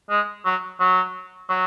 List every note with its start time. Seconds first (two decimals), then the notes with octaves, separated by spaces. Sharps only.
0.10 G#3
0.45 F#3
0.80 F#3
1.49 F#3